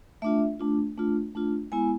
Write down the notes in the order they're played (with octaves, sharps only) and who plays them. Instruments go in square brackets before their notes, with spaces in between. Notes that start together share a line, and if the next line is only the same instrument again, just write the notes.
[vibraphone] A3 D4 F4 E5
A3 D4 F4
A3 D4 F4
A3 D4 F4
G#3 B3 E4 G#5